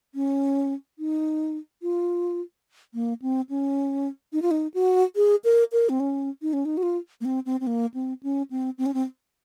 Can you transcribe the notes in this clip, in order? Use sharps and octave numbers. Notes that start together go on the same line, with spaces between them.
C#4
D#4
F4
A#3
C4
C#4
D#4
F4
D#4
F#4
G#4
A#4
A#4
C4
C#4
D#4
C#4
D#4
F#4
F4
A#3
C4
C4
C4
A#3
C4
C#4
C4
C4
C#4
C4